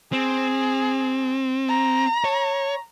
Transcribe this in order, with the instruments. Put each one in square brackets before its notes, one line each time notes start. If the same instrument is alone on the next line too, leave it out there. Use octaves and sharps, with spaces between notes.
[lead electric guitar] C4 [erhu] G#4
[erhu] A#5
[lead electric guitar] C#5